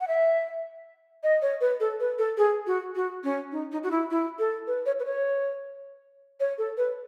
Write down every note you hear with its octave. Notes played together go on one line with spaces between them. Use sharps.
F#5
E5
D#5
C#5
B4
A4
B4
A4
G#4
F#4
F#4
C#4
D#4
D#4
F#4
E4
E4
A4
B4
C#5
B4
C#5
C#5
A4
B4